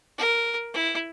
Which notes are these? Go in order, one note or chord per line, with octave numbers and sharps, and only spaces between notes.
A#4
E4